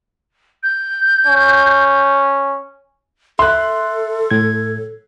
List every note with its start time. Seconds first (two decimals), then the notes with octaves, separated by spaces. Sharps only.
0.63 G6
1.27 C#4
3.39 A4 E5 C6 F#6
4.31 A2 G#6